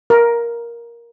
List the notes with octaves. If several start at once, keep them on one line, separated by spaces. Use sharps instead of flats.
A#4